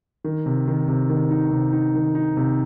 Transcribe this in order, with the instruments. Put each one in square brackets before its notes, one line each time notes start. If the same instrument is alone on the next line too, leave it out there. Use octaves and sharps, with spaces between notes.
[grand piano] D#3
C3
D#3
C3
D#3
D#4
C3
D#4
D#3
D#4
C3